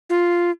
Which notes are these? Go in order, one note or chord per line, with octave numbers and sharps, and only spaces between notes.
F4